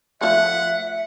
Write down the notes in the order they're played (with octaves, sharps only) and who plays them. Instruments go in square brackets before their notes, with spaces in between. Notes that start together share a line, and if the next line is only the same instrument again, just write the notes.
[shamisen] F3 A3 [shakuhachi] E5 [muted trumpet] F#5